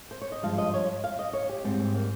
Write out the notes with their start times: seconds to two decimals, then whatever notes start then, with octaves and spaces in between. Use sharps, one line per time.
0.11 C5
0.22 C#5
0.32 D#5
0.43 G2 F3 G#3 F5
0.58 D#5
0.74 C#5
1.04 F5
1.19 D#5
1.33 C#5
1.49 G4
1.64 G#2 G3 C4
1.80 C4
1.95 A#3